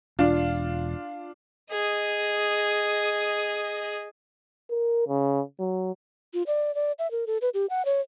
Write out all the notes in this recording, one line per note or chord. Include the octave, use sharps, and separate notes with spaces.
E1 D4 F4
G#4 D#5
A#4
C#3
F#3
F4
D5
D5
E5
A#4
A4
B4
G4
F#5
C#5